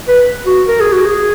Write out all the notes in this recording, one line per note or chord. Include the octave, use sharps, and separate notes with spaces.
B4
F#4
A#4
G#4
F#4
G#4